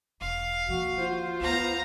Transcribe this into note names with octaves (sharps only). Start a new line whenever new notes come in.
E1 F5
D#2 F3 F#4
F4 C5
D2 B3 F5 A#5